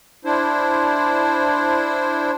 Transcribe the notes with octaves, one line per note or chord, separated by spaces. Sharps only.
D4 E4 C5